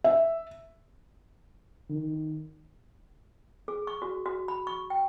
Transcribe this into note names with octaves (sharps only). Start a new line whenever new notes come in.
E5
D#3
G#4
C#6
F#4
F#4
B5
C#6
G5